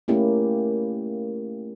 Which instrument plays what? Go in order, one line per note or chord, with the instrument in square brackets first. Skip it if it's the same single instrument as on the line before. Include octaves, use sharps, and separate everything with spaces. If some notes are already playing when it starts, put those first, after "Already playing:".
[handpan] A3 A#3 C#4 E4 G4